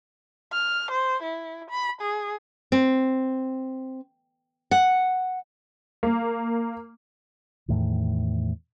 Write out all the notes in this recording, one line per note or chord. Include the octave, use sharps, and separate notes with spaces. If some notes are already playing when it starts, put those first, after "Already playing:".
F6
C5
E4
B5
G#4
C4
F#5
A#3
E2 A2 D#3